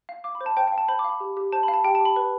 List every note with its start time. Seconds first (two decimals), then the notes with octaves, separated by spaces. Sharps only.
0.09 F5
0.24 F5 D6
0.35 B5
0.41 C5
0.46 A5
0.57 C5 G5
0.68 G5
0.72 F5
0.78 A5
0.88 C5 B5
0.99 D6
1.04 F5 B5
1.20 G4
1.37 G4
1.52 C5 A5
1.63 B5
1.68 F5
1.74 A5
1.84 G4 G5
1.95 A5
2.01 G4 B5
2.16 B4